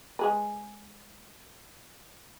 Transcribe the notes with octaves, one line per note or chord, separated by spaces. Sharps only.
G#3 G#4 B4